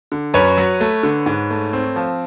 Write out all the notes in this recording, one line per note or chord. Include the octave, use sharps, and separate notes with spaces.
D3
F#2 B4 C#5
F#3
A3
D3
G#2
A3
C4
F3